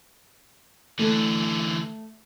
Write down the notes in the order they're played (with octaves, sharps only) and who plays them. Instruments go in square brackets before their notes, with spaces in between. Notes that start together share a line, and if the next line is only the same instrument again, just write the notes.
[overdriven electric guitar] D3 E3 [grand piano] A3